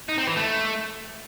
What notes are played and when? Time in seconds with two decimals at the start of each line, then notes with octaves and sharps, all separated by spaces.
0.09 D#4
0.18 C4
0.27 E3
0.36 A3